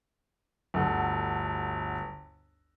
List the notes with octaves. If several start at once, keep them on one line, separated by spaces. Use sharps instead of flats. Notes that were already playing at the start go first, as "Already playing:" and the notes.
G1 D2 A4 F#5